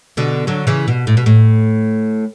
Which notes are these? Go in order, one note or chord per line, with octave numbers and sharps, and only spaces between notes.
B2 D3
D3 F#3
C#3 E3
B2
A2
B2
A2